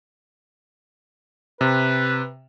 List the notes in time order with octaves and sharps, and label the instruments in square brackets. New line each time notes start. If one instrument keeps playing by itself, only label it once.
[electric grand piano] C3 [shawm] B4